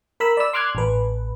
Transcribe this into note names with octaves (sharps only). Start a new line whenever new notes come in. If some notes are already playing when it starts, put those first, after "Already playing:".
A#4 B5 E6
D5 E6
C6 D6 F6 F#6 G#6
A1 B4